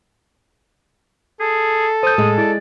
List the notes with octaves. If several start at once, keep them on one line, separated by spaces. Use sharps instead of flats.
G#4 A4
C5 D#6 G6
A2 G#3
E4 D5